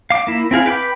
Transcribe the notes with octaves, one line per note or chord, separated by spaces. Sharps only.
F5 D6
A#3 E4
C4 E4 G#4 F5
B4 G5 B5 D6